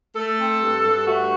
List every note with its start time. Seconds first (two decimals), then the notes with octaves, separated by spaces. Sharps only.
0.16 A3 A4
0.39 C4
0.62 G2
0.85 G2
1.07 A3 F#4